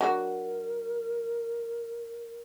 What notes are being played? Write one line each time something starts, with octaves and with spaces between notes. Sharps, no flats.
F#3 D4 F#4 A#4